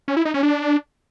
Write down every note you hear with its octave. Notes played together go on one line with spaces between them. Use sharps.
C#4
E4
D#4
C#4
D4